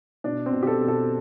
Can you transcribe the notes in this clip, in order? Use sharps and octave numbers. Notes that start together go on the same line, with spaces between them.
B2 D4
C4
B2
G4
A4
B2
A4